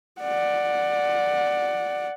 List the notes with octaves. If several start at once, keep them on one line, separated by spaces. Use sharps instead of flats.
D5 F#5